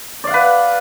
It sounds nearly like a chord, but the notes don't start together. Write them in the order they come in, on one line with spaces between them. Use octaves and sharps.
D5 F5 F#5 B4